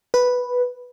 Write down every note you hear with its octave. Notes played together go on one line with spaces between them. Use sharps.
B4